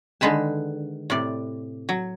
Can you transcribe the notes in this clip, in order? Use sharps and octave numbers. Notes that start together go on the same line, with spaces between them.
D3 D#3 G#3 B4 A5
A2 C3 D5
F#3